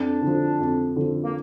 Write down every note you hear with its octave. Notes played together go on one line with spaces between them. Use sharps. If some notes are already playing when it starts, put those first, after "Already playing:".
Already playing: F2 D4
D3 F3
F2
D3 F3
A#3